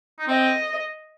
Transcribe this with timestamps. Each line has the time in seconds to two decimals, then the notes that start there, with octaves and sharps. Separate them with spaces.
0.19 D#4
0.28 C4 D#5